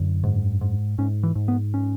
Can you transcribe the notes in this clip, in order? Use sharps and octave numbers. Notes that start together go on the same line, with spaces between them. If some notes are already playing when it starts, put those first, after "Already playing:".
Already playing: F#2 D3
G#2
G#2
G#2 C#4
E3
G#2
B3
C#4